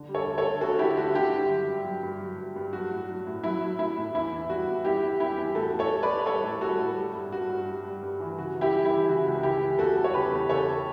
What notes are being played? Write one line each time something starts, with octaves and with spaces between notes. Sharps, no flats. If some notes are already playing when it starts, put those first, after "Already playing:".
Already playing: D3
G3
A4 C#5
D2
A4 C#5
D3
D2 F#4 A4
D3 E4 G4
D2 F#4
D3 E4 G4
G2
F#3
G2
F#3
G2
F#3
G2
G2
F#3 F#4
A2
F#3
A2
F#3 E4
F#3
A2 E4
A2
E2 E4
E2
G3 F#4
E2
G3 E4 G4
G3
G3 E4 G4
E2
A2 F#4 A4
A2
A4 C#5
G3
B4 D5
G3
G3 A4 C#5
A2
G3 F#4 A4
A2
G3
G2
G2 F#4
G2
G3
G3
G2
E3
C#3 F#4
E3
E4 G4
G3
E4 G4
E3
C#3 F#4
C#2
C#3 E4 G4
E3
E2 F#4 A4
G3
C#5
C#3 G4 B4
E2
C#3 A4 C#5